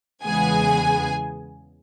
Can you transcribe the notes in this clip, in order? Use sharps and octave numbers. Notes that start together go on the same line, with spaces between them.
E2 C#3 E3 G#3 B3 G#4 G#5